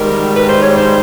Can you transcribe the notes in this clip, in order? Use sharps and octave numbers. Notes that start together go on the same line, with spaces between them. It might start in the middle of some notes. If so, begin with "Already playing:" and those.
Already playing: G#2 D#3 G3 A#4
B4
C5
C#5
C5